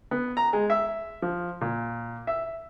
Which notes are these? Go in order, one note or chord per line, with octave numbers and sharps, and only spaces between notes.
B3
A#5
G#3
E5
F3
A#2
E5